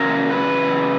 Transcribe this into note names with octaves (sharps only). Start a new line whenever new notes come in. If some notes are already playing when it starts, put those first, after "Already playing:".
Already playing: E2 C#3 F#3 A#4
B4